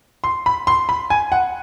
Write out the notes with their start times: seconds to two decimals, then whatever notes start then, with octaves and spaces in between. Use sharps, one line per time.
0.24 C6
0.46 B5
0.67 C6
0.89 B5
1.10 G#5
1.32 F#5